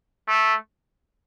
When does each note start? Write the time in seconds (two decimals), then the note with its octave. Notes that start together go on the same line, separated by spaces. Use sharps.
0.28 A3